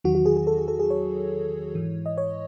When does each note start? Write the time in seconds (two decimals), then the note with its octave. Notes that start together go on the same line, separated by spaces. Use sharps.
0.04 E2 D#3 F#3 F#4
0.15 F#4
0.26 G#4
0.37 G#4
0.47 A4
0.58 G#4
0.68 A4
0.79 G#4
0.90 C#5
1.75 G#2 E3
2.06 D#5
2.18 C#5